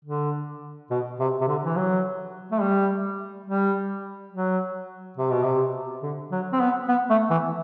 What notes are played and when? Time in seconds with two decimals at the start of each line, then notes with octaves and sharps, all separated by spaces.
0.05 D3
0.90 B2
1.19 C3
1.41 C3
1.47 D3
1.65 E3
1.76 F#3
2.52 A3
2.61 G3
3.46 G3
4.32 F#3
5.17 C3
5.31 B2
5.44 C3
6.02 D3
6.31 F#3
6.53 C4
6.60 B3
6.88 B3
7.10 A3
7.30 E3